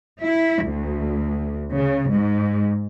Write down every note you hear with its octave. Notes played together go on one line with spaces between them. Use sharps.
E4
D2
C#3
G#2